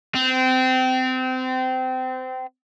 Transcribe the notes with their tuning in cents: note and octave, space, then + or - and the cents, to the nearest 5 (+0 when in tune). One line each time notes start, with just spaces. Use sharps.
C4 -25